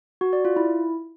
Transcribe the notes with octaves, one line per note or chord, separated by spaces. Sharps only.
F#4
D5
F4
E4